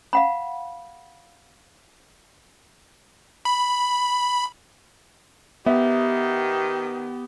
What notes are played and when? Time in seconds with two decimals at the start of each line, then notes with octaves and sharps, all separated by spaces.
0.13 F5 F#5 B5
3.45 B5
5.66 D#3 B3 G4 E5